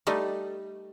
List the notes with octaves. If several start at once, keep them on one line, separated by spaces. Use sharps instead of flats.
G3 A3 D#4